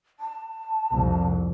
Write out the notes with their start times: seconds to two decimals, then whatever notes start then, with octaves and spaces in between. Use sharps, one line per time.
0.20 A5
0.92 C2 F2